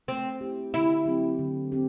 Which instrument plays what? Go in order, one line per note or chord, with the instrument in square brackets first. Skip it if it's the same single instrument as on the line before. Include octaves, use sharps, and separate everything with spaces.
[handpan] A3 [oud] C4
[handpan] E4 G4
[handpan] D3 [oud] E4
[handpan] F#3 C4 G4
D3
C4 G4